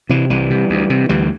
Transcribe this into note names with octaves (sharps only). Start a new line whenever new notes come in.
C3 E3
C2 E3 G3
C3
D2
C3
D2 E3 G3